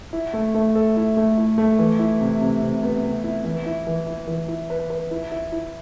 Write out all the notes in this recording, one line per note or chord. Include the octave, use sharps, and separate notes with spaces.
E4
A3
A3
A4
E4
A3
E4
A3
E3
E4
C3
C3
C3
B3
C3
E4
E3
E4
E3
E4
E3
E4
B4
B4
E4
E4
E4